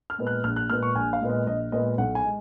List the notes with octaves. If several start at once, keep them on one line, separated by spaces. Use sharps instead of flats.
F6
A#2 G#3 B3
F#6
A#1 F6
F#6
A#2 G#3 B3 F6
C#6
A#1 G#5
F5
A#2 G#3 B3
D#5
A#1 D#5
A#2 G#3 B3 D#5
B1 F#5
G#5
G#3